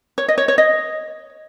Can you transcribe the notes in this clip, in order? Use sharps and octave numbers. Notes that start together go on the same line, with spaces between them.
C#5
D#5
C#5
C#5
D#5